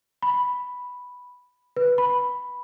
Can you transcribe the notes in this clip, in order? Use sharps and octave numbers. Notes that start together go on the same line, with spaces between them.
B5
B4
B5